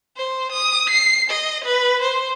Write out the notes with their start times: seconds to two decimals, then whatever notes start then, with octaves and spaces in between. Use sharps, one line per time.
0.16 C5
0.52 D#6
0.89 C7
1.30 D#5
1.64 B4
2.01 C5